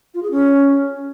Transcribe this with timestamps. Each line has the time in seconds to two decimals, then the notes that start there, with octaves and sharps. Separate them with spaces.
0.14 F4
0.23 G#4
0.31 C#4